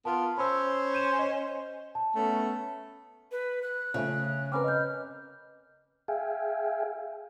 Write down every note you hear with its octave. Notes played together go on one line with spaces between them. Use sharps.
B3 F4 A#4 A5
C#4 C5 B5 E6
G6 D#7 E7
D#5
A5
A3 B3 C#4
B4
F#6
C#3 F3 A3 C#4
C4 C#4 A#4 B4 B5 D6 F6
D#5 G6
G#4 E5 F5 G5 G#5